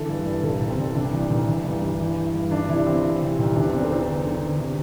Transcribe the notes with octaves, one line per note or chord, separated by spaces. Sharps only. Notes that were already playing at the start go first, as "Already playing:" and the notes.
Already playing: D3 E3 A4
G2
G2
C2 A4
C2
C4
C2
C3 D4
E3
C2
E3
G2
G2
E3
E3
G2
E3 D4
C3 E4
E3 C4
E3
C3
C2
E2 D4
E2 C4
A4
E2 C5
D3
D3
D3
C3